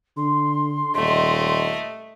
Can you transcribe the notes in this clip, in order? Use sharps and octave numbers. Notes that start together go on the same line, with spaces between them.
D3 C6
D#1 A3 D#5